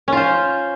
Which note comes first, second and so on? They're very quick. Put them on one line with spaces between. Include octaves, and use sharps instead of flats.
C#4 F4 C5